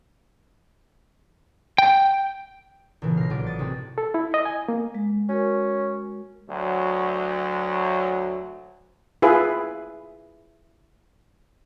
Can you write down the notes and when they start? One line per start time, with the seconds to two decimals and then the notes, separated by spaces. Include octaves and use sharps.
1.78 G5
3.02 B1 A#2 C#3 E3
3.17 F5 A#6
3.30 A1 F#3 F4 D5 D7
3.45 D#6 A6 C#7
3.59 C3 G#3 C4 C#4 F#4
3.98 A4
4.14 E4
4.34 D#5
4.45 G#5
4.68 A#3
4.95 G#3
5.29 C#4 F#4 A#4
6.50 D2 F#3
9.22 E4 F4 G#4 B4